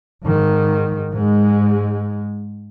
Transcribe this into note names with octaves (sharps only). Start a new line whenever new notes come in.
G#2 D#3
G#2 G#3